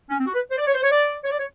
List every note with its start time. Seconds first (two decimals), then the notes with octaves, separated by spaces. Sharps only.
0.10 C#4
0.19 C4
0.26 F#4
0.34 B4
0.51 C5
0.58 D5
0.66 C#5
0.74 C5
0.83 C#5
0.91 D5
1.24 C#5
1.31 D5
1.39 C#5